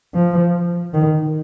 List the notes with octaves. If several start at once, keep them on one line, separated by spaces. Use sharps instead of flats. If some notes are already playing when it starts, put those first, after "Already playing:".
F3
D#3